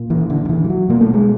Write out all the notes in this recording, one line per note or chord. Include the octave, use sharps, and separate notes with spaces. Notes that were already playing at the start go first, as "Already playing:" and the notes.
Already playing: A#2
E3
D3
D#3
E3
G3
F#3
B2 A#3
A3
G#3